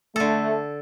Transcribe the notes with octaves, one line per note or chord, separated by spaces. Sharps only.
D3 A3 A4